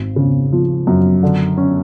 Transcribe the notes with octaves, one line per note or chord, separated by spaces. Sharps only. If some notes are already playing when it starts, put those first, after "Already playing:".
Already playing: G#1
C#3
F3
F#2
D3
C#4